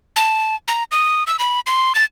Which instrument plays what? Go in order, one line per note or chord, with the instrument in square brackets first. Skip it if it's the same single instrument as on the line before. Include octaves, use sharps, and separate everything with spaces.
[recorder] A5
A#5
D#6
E6
B5
C6
A6